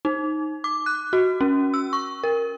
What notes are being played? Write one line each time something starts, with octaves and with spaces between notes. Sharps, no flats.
D#4
D6
F#6
F#4
C#4
E6
C#6
A#4